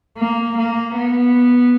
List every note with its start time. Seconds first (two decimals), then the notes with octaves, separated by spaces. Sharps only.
0.18 A#3
0.57 A#3
0.97 B3